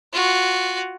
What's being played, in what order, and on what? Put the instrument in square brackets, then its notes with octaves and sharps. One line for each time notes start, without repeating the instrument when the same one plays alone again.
[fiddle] F4 F#4